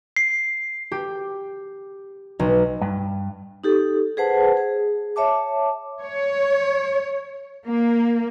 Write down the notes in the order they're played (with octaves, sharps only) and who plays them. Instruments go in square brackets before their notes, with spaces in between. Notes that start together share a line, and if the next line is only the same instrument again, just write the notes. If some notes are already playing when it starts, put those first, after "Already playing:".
[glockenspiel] C7
[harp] G4
B1
[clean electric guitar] G2
[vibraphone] D#4 G4 A4
G#4 B4 C5 F#5 A5
G#4
C#5 E5 A5 D6
[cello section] C#5
A#3